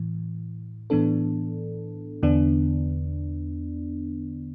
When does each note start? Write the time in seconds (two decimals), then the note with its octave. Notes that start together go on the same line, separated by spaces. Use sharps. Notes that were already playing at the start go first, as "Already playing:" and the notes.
Already playing: A2 E3
0.90 A2 E3 B3 D4 A4
2.23 E2 D3 B3 D4